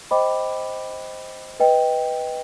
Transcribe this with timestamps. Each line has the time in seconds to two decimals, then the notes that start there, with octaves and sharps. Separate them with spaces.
0.11 C5 D#5 G5 B5 D6
1.60 B4 D#5 G5